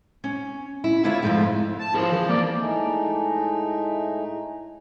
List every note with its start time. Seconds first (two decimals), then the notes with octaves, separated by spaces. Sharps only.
0.24 C#4
0.84 E4
1.04 D3 E4 F4 C#5 E5
1.23 F2 G#2 C#3 F3 A3 F5
1.79 A5
1.94 F3 E4 G#4 A#4
2.12 E3
2.29 A#3 C4 A#4 D5
2.55 A2 G#3 A3 D#4